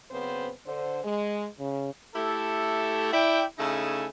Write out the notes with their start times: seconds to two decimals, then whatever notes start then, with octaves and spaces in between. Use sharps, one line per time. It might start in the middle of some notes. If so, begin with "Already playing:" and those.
0.11 F#2 C#3 B3 C4 C5
0.67 D3 C5
1.04 G#3
1.59 C#3
2.15 A3 E4 G4 A4
3.12 E4 D5 E5 G5
3.58 C#3 A3 D#4 E4 A4 G#5